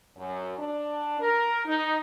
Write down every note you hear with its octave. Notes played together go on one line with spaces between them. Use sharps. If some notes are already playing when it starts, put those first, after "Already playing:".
F#2
D4
A#4
D#4